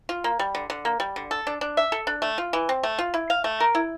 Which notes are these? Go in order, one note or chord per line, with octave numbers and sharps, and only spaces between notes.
F4
A#3
G3
D3
D3
A#3
G3
D3
A4
D4
D4
E5
A4
D4
A3
F4
E3
C4
A3
F4
E4
F5
A3
A#4
E4